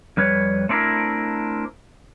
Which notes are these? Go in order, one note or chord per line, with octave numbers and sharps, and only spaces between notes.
F2 G3 B4 C#5
A3 C4 D4 E4 A#4